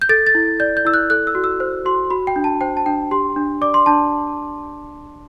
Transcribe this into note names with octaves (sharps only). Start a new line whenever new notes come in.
G6
A4 A6
A6
E4
D5 G6
G6
E4 E6
F#6
A4 F#6
E6
F#4
E6
C5
F#4 C6
F#4 B5
G5
D4
A5
C5 G5
A5
D4 G5
G4 C6
D4
D5 D6
C6
D4 A5